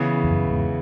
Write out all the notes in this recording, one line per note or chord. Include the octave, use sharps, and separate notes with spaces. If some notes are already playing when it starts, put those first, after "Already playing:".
Already playing: C#3 E3 B3
E2
F#2
E2 G#2